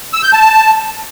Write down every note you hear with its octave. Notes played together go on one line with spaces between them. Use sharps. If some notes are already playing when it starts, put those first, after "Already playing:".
E6
G6
A5